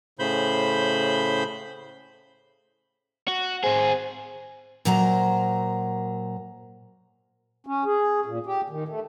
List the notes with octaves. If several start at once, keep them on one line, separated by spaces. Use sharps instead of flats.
A2 C#3 C5 B5 G6
F#4
C4 G#4 C5
A#2 F#3 A#4 C5 A#5
C#4
G#4
A#2
G4
D#3
A3